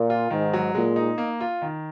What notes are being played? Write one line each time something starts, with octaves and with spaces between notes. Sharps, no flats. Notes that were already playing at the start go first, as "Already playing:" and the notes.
Already playing: A#2
F4
G#2 D#3
F#3
A#2 G#3
D#4
A#3
F4
D#3